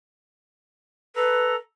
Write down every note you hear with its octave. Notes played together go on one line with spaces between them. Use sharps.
A4 B4 A#5